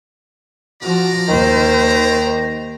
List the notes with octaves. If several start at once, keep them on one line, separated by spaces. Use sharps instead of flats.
F3 F#4 D5 A#5
D#2 D#3 C5